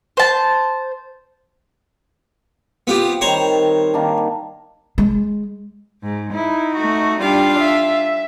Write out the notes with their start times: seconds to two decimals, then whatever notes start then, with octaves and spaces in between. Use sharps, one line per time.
0.17 C5 A5
2.87 B3 C4 F4 G4
3.21 D#3 G3 C5 C#5 A#5
3.94 D#3 A#3 D4
4.98 G#3
6.04 G#2
6.35 D#4 E4
6.76 A3 F#4
7.20 G3 D4 F4 F5
7.59 E5